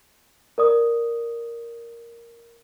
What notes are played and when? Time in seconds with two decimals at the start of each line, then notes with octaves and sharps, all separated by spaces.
0.58 A#4 D5 D#6